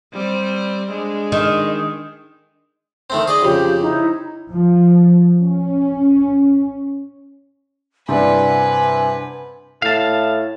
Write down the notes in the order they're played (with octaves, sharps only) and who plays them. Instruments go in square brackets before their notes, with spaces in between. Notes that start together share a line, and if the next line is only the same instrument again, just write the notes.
[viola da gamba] G3 C4 C5
G#3 D4
[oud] D#3
[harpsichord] D#3 A3 C4
G#4 D5 D#5
[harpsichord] F2 C#3 [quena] G4
[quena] D#4 [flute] E4
[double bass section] F3
C#4
[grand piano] G2 C3 E4 [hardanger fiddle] B4 [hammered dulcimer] C5 D5 F#5 [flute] G#5
[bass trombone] A2 [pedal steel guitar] F5 A5